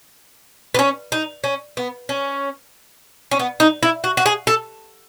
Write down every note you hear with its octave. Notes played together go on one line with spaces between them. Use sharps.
B3
C#4
D#4
C#4
B3
C#4
C#4
B3
D#4
E4
F#4
F#4
G#4
A4